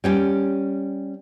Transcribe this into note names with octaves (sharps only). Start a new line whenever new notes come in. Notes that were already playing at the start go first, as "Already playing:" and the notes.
G3 C#4 G4